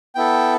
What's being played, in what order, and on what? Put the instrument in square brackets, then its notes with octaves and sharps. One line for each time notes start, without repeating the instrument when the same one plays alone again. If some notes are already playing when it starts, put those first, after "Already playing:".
[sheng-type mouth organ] B3 E4 A4 G5